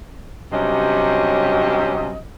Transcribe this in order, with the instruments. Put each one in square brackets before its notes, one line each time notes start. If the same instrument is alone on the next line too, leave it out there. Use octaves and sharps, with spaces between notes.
[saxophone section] G2 C3 F#3 C#4 G4 D#5